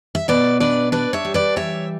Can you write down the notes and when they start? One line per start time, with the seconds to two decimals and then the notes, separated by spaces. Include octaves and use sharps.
0.15 E5
0.28 B2 B4 D5
0.60 D4 B4 D5
0.92 D4 B4 D5
1.13 C#5 E5
1.25 G3
1.34 B4 D5
1.56 E3 C#5 E5